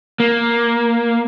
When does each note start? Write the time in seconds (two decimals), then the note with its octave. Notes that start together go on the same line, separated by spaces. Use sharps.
0.20 A#3